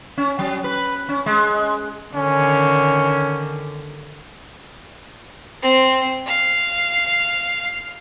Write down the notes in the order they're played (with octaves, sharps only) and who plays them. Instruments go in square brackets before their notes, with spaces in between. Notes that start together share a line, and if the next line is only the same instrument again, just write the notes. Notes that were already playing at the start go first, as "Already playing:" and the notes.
[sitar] C#4
F#3
B4
C#4
G#3
[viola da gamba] D3 D#3 [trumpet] C#4
[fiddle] C4
F5